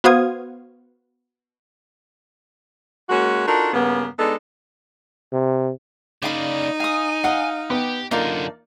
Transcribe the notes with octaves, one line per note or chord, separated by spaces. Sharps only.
B3 F#4 C5 F5 D#6 G#6
G#3 A#3 C#4 F#4
D4 D#4 F4 F#4 A4 A#4
G2 C#3 A#3 B3
G#3 B3 D4 D#4 A4
C3
C#3 A#3 D#4 D5 F5 B5
F5 G#5 D#6
D#5 F5 F#5
B3 G4
F#2 D3 A#3 D#4 F4 D5